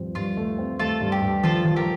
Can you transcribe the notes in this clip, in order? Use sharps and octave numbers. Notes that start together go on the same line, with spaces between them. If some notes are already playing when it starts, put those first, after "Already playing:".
Already playing: G2 F3 C4
G2 F4
A3
C4
A3 F4 A4
G2
G4
G2
F3 F4 A4
F3
G4 A#4